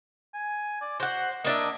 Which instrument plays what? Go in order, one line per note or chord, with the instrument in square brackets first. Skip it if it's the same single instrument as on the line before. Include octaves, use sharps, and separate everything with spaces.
[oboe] G#5
D5
[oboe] F#4 [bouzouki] C5 F#5
[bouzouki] A#3 D4 E5 [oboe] D#5